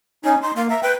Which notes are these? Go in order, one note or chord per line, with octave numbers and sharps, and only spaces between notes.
C#4 D#4 G#5
D#4 C6
A#3 F5
E5 A#5
B4 G5